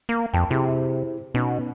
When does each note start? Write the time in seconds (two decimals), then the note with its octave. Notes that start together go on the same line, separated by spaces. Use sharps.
0.09 A#3
0.34 F2 G5 A5
0.51 C3 E4 G4 G#4
1.34 B2 B3 C#4 D#4